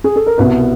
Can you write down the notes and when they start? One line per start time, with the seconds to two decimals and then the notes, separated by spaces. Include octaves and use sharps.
0.04 G#4
0.16 A4
0.26 A#4
0.38 C2 B2 B4